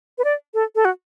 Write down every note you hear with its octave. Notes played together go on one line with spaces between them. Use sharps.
B4
D5
A4
A4
F#4